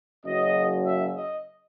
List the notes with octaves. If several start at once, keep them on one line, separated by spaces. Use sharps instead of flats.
F#1 F#2 C#3 F#3 D#5
E5
D#5